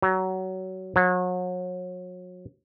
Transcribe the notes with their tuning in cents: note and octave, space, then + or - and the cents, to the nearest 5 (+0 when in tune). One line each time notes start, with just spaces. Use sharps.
F#3 +20
F#3 -35